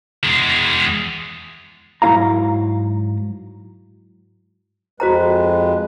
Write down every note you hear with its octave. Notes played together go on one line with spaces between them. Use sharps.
E2 G#3
G#2 F#3 E4 F4 F5 A#5
F2 G#3 F#4 B4 C5 A#5